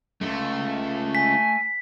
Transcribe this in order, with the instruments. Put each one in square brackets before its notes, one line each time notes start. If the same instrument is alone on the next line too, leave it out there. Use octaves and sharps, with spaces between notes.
[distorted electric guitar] C#2 F#2 [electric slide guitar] A3
[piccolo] G#5 [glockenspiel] B6